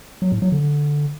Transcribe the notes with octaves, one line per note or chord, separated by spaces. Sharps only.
F#3
A2
F#3
D3